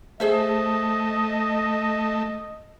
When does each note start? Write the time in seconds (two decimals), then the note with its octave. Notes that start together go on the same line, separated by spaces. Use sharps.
0.20 A3 G#4 C5 D#5 E5